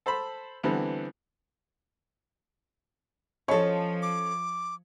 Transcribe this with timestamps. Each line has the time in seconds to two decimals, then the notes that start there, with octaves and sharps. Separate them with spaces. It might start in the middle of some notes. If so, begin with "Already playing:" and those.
0.06 A4 C5 A5 B5
0.63 D3 E3 G3 B3 C4
3.48 F3 C#4 A4 C#5 D#5 C#6
4.02 D6